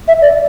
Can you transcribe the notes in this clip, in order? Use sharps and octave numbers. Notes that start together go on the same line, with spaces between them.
E5
D5